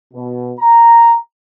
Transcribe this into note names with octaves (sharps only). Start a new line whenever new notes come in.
B2
A#5